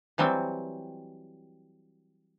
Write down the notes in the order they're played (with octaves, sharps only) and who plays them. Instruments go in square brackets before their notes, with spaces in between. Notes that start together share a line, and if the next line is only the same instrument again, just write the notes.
[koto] E3 F#3 G3 C4